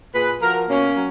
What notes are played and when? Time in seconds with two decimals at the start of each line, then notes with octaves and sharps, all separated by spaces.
0.13 A#2 G#4 B4
0.41 F3 F#4 A#4
0.68 B2 A#3 C#4
0.95 F#3